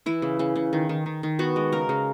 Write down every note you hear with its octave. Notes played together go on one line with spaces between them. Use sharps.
E3 E4
C#3
C#3
C#3
D#3
D#3
D#3
D#3
B3 F#4
G#3
C#3 A#4
C#3